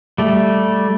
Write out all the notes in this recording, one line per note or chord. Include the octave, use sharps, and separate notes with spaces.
G3 A3